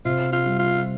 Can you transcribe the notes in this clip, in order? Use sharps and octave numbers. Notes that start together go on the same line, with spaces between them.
C3 F4
F4
G3
F4